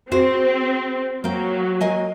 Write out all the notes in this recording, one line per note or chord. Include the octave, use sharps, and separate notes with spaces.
C4 F#4 G#4 C5
F#3 A#3 F5 G5
A#3 D#5 G#5